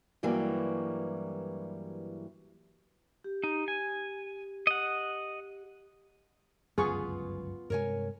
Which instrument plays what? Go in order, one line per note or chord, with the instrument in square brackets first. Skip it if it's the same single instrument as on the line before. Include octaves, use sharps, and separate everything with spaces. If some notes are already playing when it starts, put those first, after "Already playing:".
[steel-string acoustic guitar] G2 E3 F#3 G3 A#3 E4
[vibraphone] G4
[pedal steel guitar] D#4
G#5
D#5 F#5
[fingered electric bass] G1 C#2 F#2 [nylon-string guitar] B3 F4 B4 [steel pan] G#4 C#6
[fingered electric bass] G2 C3 G#3 [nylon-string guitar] A#4 C#5 G#5